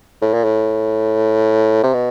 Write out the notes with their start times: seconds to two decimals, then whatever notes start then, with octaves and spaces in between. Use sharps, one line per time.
0.22 A2
0.33 A#2
0.44 A2
1.83 C3
1.94 B2